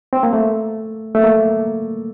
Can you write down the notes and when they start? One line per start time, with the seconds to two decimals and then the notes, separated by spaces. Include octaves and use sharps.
0.13 C4
0.23 A#3
0.33 A3
1.15 A3
1.23 A#3